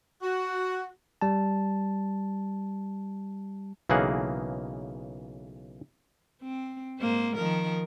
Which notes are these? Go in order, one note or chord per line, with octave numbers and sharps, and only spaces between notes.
F#4
G3 A5
B1 C#3 E3 A#3 G#4 F#5
C4
G#2 A#3 C5
D#3 F3 A#4